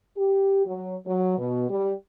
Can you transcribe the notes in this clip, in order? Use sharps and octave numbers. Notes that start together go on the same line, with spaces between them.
G4
F#3
F#3
B2
G3